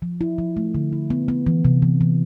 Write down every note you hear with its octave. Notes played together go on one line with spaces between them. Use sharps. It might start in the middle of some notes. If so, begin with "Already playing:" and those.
F3
E4
F3
A3
D3
E4
B3
B3
E3
C3
E3
E3